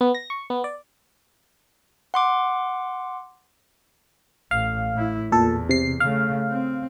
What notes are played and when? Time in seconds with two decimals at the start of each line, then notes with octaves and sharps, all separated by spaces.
0.01 B3
0.15 A#6
0.30 C#6
0.50 B3
0.64 D5
2.14 F#5 C6 D6
4.51 A1 F5
4.94 A2 E4
5.32 E2 A#2 A4
5.69 C3 C7
6.00 C#3 A3 F5
6.50 C4